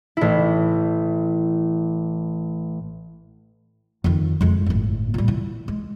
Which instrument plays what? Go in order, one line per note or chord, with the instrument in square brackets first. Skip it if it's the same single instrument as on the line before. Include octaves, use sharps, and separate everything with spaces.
[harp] A1 E4
[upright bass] F2 D#3
F2 G#3
G1 A2
A#2 G3
E3
G#3